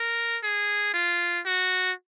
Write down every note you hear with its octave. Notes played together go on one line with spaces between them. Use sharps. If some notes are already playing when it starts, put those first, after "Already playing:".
Already playing: A#4
G#4
F4
F#4